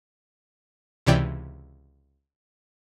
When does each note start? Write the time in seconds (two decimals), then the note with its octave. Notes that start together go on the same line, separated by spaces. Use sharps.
1.06 C#2 C3 E3 C#5 D5 G5